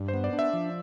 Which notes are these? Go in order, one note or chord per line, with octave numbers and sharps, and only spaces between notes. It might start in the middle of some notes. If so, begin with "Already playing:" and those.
Already playing: G2
C5
B3
D5
D4
E5
F3